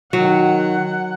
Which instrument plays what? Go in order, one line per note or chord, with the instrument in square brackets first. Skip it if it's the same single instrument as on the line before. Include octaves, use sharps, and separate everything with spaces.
[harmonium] D#3 [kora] F#3 [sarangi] F#5